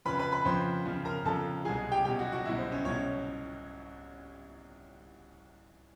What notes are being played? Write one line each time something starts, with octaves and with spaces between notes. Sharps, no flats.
F2 C#3 F3 B4 B5
B4 B5
B4 B5
F2 C#3 F3 C5 C6
F2 C#3 F3
A#4 A#5
F2 C#3 F3 A4 A5
C2 B2 F#3 G#4 G#5
G4 G5
C2 B2 F#3 G4 G5
F#4 F#5
F#4 F#5
C2 B2 F#3 E4 E5
C5
C#4 C#5
C2 B2 F#3 C#4 C#5